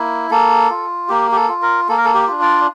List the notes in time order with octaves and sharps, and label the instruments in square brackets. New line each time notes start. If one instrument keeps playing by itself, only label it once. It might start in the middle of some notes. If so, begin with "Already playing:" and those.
Already playing: [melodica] A#3 E4
A#3 A4
F4
A#3 G4
G4
A4
F4
A#4
A#3 A4
A#4
A4
G4
D4 F4
D5